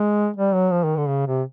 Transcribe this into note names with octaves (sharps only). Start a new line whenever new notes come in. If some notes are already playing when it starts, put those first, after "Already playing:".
Already playing: G#3
G3
F#3
F3
D#3
D3
C#3
C3